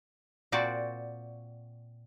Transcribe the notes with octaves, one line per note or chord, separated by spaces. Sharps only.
A#2 C4 F#4 D5